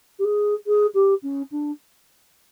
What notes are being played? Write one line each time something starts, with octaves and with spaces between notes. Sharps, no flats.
G4
G#4
G#4
G4
C#4
D4